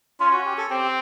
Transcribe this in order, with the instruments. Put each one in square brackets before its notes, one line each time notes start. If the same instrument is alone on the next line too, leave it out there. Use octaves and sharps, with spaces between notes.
[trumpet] C#4 [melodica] F4
[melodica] F#4
G4
A4
[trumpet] C4 [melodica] G4